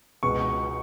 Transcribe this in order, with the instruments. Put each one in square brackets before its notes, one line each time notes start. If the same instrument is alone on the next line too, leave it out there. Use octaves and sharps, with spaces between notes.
[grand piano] C#2 B2 G#3 C#6